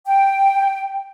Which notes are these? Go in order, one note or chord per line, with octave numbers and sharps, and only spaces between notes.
G5